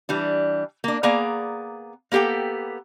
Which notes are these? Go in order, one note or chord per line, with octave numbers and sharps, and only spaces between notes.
E3 G3 D4
A#3 D4
A#3 B3 G#4 D5 A#5
A#3 B3 G4 A4 G5